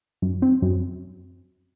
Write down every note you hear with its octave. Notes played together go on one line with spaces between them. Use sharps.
F#2
C4
F#2